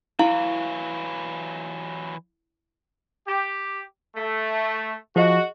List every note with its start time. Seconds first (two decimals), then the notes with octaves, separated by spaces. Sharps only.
0.19 E3 F#3 E4 F5
3.27 G4
4.16 A3
5.16 F3 F#4 G#4 D#5